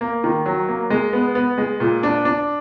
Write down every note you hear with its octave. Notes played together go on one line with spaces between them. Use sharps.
A#3
D#3
F#3
A#3
G#3
B3
B3
G#3
A#2
D4
D4